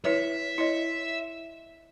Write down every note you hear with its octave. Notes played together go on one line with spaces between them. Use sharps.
E4 B4 C#5 E5
E4 C#5 D#5